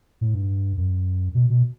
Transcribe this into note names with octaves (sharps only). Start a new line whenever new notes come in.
A2
G2
F#2
B2
B2